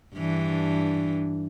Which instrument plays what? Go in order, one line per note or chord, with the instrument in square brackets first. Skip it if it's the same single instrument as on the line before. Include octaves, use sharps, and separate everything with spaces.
[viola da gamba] G2 E3 D4